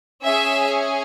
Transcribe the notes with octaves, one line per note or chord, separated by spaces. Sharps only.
C#4 G#4 E5